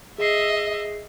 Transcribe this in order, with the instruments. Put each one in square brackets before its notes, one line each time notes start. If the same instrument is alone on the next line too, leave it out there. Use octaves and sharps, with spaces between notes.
[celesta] G#4 C7 [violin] D#5 E5